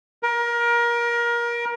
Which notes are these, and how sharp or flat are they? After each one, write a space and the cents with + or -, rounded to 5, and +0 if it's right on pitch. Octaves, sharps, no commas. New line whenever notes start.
A#4 +25